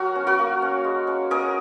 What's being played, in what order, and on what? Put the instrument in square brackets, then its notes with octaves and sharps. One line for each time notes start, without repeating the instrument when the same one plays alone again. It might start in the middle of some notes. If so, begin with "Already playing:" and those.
Already playing: [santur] F#3 F#4 A#4
C#4
F#4 A#4
A#3
C#4
G#3
C#4
C#4 A#4 D#5